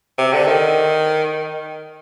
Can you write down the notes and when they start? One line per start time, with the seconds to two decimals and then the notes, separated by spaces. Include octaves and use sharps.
0.18 C3
0.33 D3
0.47 D#3